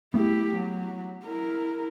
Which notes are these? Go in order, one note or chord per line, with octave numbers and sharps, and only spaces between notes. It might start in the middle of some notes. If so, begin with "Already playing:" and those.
A3 B3 E4 G4
F#3
E4 A#4